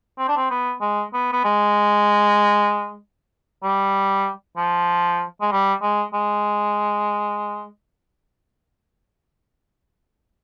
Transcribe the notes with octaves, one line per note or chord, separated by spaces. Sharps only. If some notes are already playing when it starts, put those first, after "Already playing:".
C4
D4
C4
B3
G#3
B3
B3
G#3
G3
F3
G#3
G3
G#3
G#3